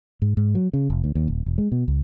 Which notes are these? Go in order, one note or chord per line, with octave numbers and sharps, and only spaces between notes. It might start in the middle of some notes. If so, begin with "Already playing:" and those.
G#2
G#2
F#3
C#3
F1
D2
D#2
D#1
E1
G#3
B2
C#2